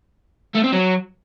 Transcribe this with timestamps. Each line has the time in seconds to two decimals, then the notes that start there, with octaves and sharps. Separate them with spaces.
0.55 A3
0.64 C4
0.73 F#3